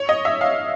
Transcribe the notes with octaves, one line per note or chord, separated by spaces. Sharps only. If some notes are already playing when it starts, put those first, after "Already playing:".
Already playing: C#5
D#5
E5
F5